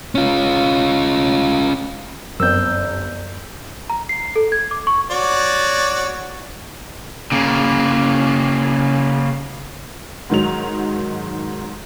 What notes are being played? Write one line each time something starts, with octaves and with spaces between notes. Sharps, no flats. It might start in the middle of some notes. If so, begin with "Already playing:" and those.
C#4 F4
G1 F#2 C4 A#4 E6 G6
A#5
C7
A4
G#6
D6
C#6
F#4 C#5 D5
C#3 A#3
G#2 D#3 F#3 F7